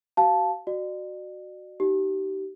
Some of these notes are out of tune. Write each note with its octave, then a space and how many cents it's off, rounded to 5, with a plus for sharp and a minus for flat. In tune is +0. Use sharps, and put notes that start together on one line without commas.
F#4 +40 F5 +0 A5 -10
F#4 +0 D5 +40
D#4 +0 G4 -30